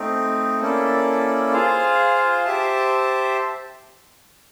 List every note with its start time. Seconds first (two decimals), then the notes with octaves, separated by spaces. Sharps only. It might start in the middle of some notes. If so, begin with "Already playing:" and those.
Already playing: A3 C4 D#4
0.60 A#3 C#4 E4 A4 D5
1.52 F4 G#4 C5 F5
2.44 G4 C5 E5 A5